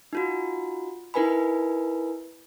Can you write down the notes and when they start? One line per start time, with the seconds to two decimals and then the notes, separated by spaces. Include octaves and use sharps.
0.13 D#4 F4 F#4
1.14 D#4 E4 A#4 B4 G#5 B5